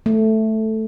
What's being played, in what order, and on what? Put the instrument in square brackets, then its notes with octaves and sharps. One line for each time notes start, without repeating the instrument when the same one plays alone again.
[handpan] A3